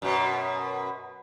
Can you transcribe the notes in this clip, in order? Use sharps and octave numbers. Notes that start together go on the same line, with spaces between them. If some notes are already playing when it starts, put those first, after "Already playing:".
F#2 B2